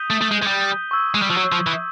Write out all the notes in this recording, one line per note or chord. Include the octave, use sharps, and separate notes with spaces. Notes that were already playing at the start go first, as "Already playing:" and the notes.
Already playing: D#6 G6 B6 D#7 G7
A3
A3
G#3
G#3
G3
C#6 E6 G#6
G#3
G3
F3
F#3
F3
E3